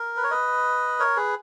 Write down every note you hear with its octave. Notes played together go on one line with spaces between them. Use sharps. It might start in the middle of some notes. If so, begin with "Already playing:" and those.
Already playing: A#4
B4
C#5
B4 D#5
A#4 C#5
G#4 B4